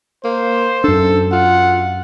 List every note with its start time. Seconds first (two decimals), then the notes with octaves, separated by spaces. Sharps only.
0.24 A#3 C5
0.84 F#2 D4 A4
1.32 F4 F#5